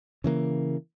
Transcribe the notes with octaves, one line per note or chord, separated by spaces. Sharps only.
C#3 E3 A#3